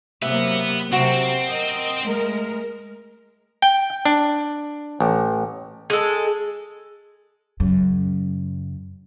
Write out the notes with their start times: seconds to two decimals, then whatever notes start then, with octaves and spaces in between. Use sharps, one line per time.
0.22 C3 F#3 A#3 B3 B4 E5
0.92 C3 F#3 A#3 C4 F#4
1.45 A#4 D#5
2.04 G#3 A3 A#4
3.62 G5
4.05 D4
5.00 A1
5.90 G#3 A4
7.60 F#2 C#3